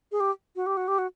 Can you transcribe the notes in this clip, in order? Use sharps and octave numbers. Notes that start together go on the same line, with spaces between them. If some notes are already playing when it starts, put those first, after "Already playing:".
G#4
G4
F#4
G4
F#4
G4
F#4